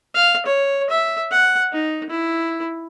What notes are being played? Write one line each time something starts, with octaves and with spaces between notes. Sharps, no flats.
F5
C#5
E5
F#5
D#4
E4